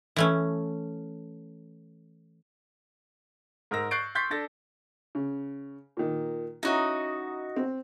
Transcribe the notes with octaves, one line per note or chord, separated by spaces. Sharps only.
E3 A3 C#4
G#2 A#4 A#5 E6 A#6
C#6 F#6 G6 A6 C7 D7
C6 C#6 G6 A6 B6 C7
D4 A4 A6 A#6
C#3
A#2 D#3
C#4 D#4 E4 F#4 D#5
C4